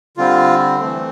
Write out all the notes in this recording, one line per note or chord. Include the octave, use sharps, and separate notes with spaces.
D3 G3 C4 F4
E3 A3 C4